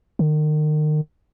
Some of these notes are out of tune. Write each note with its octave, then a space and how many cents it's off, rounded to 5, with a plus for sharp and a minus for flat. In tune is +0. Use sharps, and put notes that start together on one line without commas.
D#3 -35